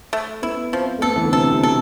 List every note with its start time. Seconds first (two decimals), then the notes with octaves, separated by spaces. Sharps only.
0.13 A3
0.42 B3 E4
0.72 F3 C4
0.98 A3
1.02 B3 A4
1.16 E3
1.24 D3
1.32 C3 A4
1.51 C3
1.63 B2 A4